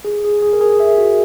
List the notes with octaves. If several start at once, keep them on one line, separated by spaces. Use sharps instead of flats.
G#4
G#4
G#4
A#4
G#4
E5
F#4